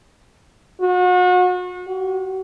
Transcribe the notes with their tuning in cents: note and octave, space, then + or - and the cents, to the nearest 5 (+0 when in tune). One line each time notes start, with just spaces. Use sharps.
F#4 -35
F#4 +35